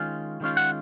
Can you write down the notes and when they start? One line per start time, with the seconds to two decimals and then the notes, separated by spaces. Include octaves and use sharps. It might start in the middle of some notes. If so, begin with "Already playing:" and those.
Already playing: D#3 G#3 C#4 F4
0.41 D#3 G#3 C#4 F4
0.57 F#5